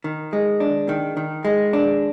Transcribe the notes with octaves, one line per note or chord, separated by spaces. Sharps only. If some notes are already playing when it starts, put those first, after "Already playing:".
D#3
G#3
D4
D#3
D#3
G#3
D4